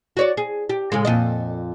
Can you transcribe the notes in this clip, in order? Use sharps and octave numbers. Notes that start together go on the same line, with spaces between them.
F#4 C#5 D5
G#4
G4
A2 C#3 G#3
F2 A#2 D#5